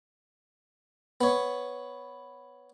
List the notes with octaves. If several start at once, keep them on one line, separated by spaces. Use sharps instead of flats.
B3 C#5